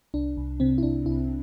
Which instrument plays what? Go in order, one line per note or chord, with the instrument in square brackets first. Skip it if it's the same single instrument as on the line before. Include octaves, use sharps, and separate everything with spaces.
[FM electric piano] C2 D4
C2
C3 C4
E4
C2 D4
C2 E4